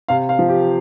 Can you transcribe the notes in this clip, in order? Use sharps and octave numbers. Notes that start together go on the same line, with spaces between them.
C3 F5
F5
F3
G4